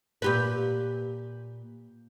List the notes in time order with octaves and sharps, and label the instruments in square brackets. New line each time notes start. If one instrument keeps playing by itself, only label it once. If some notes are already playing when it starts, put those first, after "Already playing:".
[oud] A#2 G4 B4